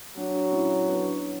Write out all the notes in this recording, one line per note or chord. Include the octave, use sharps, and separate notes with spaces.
F#3 D4 F#4
C#4 E4
B3 D4